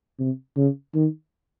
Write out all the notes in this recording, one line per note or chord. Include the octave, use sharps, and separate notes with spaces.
C3
C#3
D#3